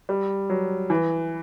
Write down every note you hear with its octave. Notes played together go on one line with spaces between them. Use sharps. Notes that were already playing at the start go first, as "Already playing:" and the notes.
G3
F#3
E3